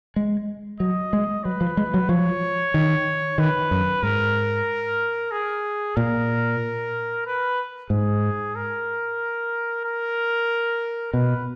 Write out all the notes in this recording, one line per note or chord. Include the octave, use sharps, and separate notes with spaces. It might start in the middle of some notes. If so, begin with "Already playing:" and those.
G#3
F#3 D#5
G#3
F#3 B4
F3
G#3
F#3
F3 C#5
D#3
D#3 B4
F#2
G#2 A#4
G#4
A#2 A#4
B4
G#2 G#4
A#4
A#4
B2 B4